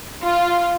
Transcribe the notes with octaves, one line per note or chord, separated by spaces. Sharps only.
F4